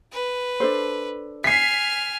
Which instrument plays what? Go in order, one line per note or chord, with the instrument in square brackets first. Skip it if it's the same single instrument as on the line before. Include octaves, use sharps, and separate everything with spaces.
[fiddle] B4
[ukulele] D4 A4 C5
[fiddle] G#5 F6 [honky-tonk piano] B6 C7